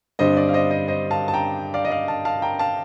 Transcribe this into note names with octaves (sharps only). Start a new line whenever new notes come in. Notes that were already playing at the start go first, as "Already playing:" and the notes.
G2 D3 G3 C4 C5 D#5
D5
F5
C5 D#5
C5 D#5
C5 D#5
F5 A5
A5
G5 A#5
D5 F5
D#5
D5 F5
F5 A5
F5 A5
G5 A#5
F5 A5